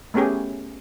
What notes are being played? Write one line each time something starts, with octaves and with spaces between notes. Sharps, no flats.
A3 B3 C#4 G4 G#4